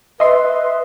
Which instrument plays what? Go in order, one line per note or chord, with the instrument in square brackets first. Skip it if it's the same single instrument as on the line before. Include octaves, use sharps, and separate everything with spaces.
[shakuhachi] B4 [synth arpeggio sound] D#5 E5 C6